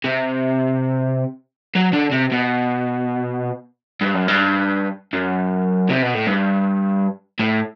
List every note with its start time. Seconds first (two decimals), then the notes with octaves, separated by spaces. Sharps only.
0.04 C3
1.75 F#3
1.93 D3
2.12 C3
2.32 B2
4.01 G2
4.14 F#2
4.28 G2
5.13 F#2
5.89 C3
6.02 B2
6.14 A2
6.27 G2
7.39 A2